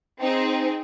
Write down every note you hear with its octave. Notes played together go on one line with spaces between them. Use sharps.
C4 D#4 G#4